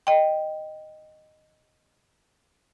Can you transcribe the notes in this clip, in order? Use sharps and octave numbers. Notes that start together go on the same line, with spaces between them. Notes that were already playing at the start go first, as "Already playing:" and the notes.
D#5 G5